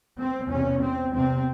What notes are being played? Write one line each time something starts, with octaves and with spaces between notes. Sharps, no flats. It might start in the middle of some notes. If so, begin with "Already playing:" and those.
C4
E2 C3 C#4
C4
E2 C3 C4